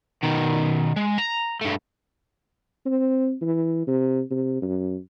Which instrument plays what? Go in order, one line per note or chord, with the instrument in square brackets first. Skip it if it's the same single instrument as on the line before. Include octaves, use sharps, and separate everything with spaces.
[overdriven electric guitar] B2 D#3
G#3
A#5
G2 A3
[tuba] C4
E3
C3
C3
F#2